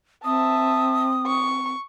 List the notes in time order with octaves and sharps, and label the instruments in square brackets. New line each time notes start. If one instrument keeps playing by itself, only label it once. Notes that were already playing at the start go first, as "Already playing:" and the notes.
[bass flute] C4 [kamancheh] E5 A5 [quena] D#6
[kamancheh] C#6